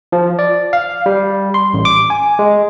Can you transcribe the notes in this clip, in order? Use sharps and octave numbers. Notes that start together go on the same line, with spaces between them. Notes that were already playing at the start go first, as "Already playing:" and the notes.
F3
D5
F5
G3
C6
A1
D6
G#5
G#3